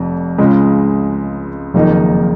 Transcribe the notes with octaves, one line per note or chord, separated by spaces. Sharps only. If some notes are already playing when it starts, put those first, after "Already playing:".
Already playing: F1 F2
C#2 C#3 G#3
F#1 F2 D#3 A#3 D#4